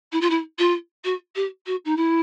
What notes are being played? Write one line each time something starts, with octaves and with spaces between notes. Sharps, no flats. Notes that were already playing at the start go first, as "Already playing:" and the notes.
E4
F4
E4
F4
F#4
G4
F#4
D#4
E4